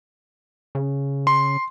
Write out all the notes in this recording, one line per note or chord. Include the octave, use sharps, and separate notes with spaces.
C#3
C6